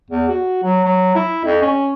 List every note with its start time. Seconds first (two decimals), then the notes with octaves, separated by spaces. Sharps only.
0.11 E2
0.29 F#4
0.63 F#3
0.84 F#3
1.15 E4
1.45 F2
1.62 C#4